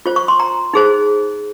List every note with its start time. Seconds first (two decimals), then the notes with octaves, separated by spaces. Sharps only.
0.06 F4 C5
0.16 C#6
0.28 C6
0.40 A#5
0.74 D#4 G#4 C5